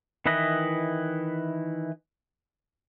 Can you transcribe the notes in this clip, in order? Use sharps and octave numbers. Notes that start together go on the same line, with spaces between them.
D#3 E3 E4 B4 D#5